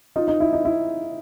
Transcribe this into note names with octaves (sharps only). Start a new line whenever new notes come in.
D#4 F4
D#4
E4
D#4
E4